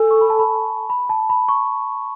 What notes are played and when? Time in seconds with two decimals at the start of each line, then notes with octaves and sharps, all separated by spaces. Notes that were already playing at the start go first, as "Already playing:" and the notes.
Already playing: A4 G#5
0.11 C#6
0.21 B5
0.30 A5
0.39 B5
0.90 B5
1.09 A5
1.30 B5
1.49 C#6